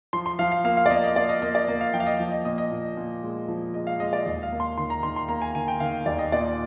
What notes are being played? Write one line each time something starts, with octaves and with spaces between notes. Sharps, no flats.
F3 C6
C6
F3 F5
F5
A#3 F5
F5
D5
A#3 D#5
D#5
A#3 D5
D#5
A#3 D#5
D5
A#3 D#5
F5
F3 G5
F5
D#5
F3
D#5
A#2 D#5
D#5
A#2
A#2
G#3
F3
G#3 D#5
F5
G#3 D#5
D5
D#2 D#5
F5
A#3
C6
D#3 C6
A#5
D#3 C6
C6
A#3 A#5
G#5
D#3 G#5
G5
D#3 F5
D#2 D5
D#5
A#2 D5